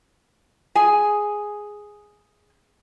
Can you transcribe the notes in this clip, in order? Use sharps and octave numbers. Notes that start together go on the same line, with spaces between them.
G#4 G#5